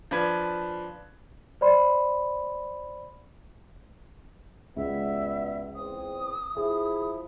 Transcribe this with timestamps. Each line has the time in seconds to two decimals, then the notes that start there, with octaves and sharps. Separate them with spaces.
0.11 F3 D4 B4 G#6
1.61 C5 D5 B5 C6
4.76 C#2 B2 G3 B3 E5
5.76 E2 C4 D#6
6.57 F3 E4 G#4